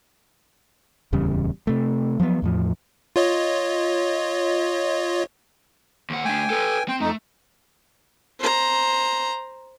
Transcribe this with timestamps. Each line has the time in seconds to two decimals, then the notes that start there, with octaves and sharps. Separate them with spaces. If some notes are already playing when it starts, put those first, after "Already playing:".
1.13 D1 E2 C#3 G3
1.67 C3 A3
2.20 F3 F#3 A#3 B3
2.42 E2 A2 F3
3.16 F4 C#5 D#5
6.10 D#2 F#5
6.25 A3 D4 G5 G#5
6.50 A4 B4
6.88 C4 G5
7.01 F2 A3 D#4
8.39 C5 A#5